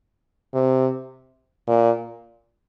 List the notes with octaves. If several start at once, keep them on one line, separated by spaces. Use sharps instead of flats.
C3
A#2